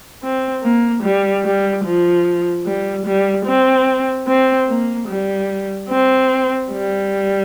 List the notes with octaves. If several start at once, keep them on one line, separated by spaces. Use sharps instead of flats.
C4
A#3
G3
G3
F3
G3
G3
C4
C4
A#3
G3
C4
G3